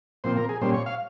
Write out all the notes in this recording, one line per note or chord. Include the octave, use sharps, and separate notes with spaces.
A#2 F3 C4 C5
A#4
G#4
A#2 G3 C#4 C5
C#5
F5